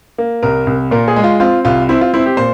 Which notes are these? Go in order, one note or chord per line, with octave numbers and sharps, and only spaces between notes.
A#3
C2 A#4
C2
A#2 A#4
G#4
G#3
F4
C4 F4
C2 F4
C4 E4
F4
C4 E4
G4
A#2 C5